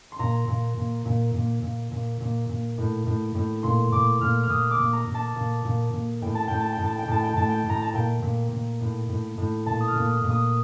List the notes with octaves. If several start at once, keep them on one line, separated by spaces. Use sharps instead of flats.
C6
A#2 A#5
A#2
A#2
A#2
A#2
A#2
A#2
A#2
A#2
A2
A2
A2
A#2 C6
A#2 D6
A#2 F6
F6
A#2 D#6
D6
A#2
A#5
A#2
A5
A#2
A#2
A#2
A2 G5
A5
A2 G5
A5
G5
A2
A5
G5
A2 A5
G5
A2 A5
G5
A2 A#5
A5
A#2 G5
A#2
A#2
A2
A2
A2
A#2 A5
D#6
F6
A#2
D#6
A#2
D#6